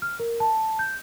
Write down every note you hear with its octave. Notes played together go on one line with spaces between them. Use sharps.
F6
A#4
A5
G6